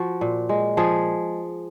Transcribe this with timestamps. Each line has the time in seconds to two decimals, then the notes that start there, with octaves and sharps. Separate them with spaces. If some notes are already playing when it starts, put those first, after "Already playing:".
Already playing: F3 F#4
0.21 A#2
0.49 G#3
0.77 F3 G#4